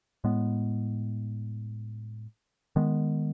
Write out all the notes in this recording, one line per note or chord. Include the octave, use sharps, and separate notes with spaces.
A2 G#3 B3
D#3 G#3 B3